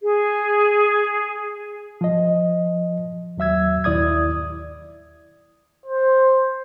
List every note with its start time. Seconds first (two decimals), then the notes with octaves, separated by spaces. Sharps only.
0.01 G#4
2.01 F3 D#5
3.37 D#2 F#3 E5 E6 G#6
3.84 D#2 E4 D5 D#6 G#6
5.86 C5